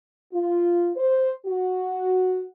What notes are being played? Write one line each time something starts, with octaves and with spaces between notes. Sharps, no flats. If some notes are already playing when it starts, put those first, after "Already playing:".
F4
C5
F#4